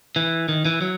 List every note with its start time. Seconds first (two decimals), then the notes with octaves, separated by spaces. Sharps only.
0.16 E3
0.49 D#3
0.65 E3
0.81 F#3